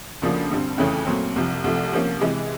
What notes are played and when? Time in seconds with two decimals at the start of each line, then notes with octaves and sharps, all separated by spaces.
0.22 D2 C#3 F3 A#3 D4
0.50 G2 D3 G3 C4
0.78 F2 C#3 E3 A3 C#4
1.07 A#2 F#3 A3 C4
1.36 C2 C3 F3
1.64 C2 C3 F3 A3
1.92 C3 F3 A#3 C#4
2.20 C3 E3 G#3